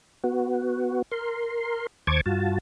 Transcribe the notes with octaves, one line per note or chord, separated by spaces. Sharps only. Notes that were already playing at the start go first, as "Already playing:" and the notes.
B3 F#4
A#4 C6
D#2 C5 A5 C#6 D6 G#6
G2 F4 F#4 A5